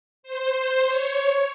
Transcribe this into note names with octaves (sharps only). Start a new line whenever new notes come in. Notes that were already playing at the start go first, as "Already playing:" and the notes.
C5
C#5